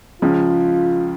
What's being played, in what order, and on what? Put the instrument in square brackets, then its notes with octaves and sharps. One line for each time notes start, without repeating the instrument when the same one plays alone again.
[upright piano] C#2 C#3 F3 [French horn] F4